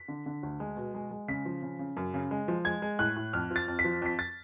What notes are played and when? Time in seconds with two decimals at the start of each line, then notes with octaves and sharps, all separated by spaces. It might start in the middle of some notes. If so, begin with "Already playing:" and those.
Already playing: B6
0.08 D3
0.26 D3
0.43 D2
0.60 G#3
0.77 B2
0.95 G#3
1.11 G#3
1.28 C#3 B6
1.45 F3
1.62 C#3
1.79 C#3
1.97 F#2
2.14 C#3
2.31 G#3
2.48 F3
2.65 G#3 G#6
2.82 G#3
2.99 A2 F#6
3.16 A2
3.33 F2 F6
3.51 F3
3.56 A6
3.68 F2
3.79 B6
3.84 F3
4.02 F2 B6
4.19 A6